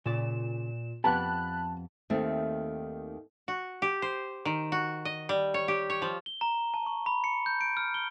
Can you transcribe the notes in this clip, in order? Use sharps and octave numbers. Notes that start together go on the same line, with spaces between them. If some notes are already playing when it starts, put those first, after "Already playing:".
A#2 C#3 D5 E7
F2 B3 G4 A5 B5 F#6
D#2 D#3 A3 C4
F#4
G4
C5
D#3
F#4
D#5
G3
C#5
G4
C#5
F3
G7
A#5
A5
C#6
B5
C#7
G6
D7
F6
G7